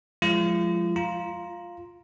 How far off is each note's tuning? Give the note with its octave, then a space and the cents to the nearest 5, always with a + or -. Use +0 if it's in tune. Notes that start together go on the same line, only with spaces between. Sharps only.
F3 +25 G#3 +0 F4 -40
F4 +0 A#5 +10